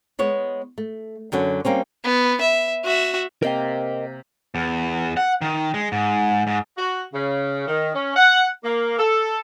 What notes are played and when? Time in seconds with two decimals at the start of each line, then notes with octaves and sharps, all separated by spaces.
0.19 G#3 B3 C#5
0.78 A3
1.32 F#2 D3 F#3 C#4
1.65 G3 A#3 C4 C#4
2.04 B3
2.41 E5
2.84 F#4 E5
3.42 C3 A#3 A#4 D#5 F5 G5
4.55 E2
5.17 F#5
5.42 D#3
5.74 G#3
5.92 G#2
6.47 G#2
6.77 F#4
7.14 C#3
7.68 D#3
7.95 C#4
8.16 F#5
8.64 A#3
8.99 A4